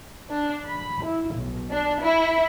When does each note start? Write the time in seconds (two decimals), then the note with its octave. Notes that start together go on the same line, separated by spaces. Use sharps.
0.30 D4
0.68 B5
1.05 E4
1.35 B1
1.70 D4
2.01 E4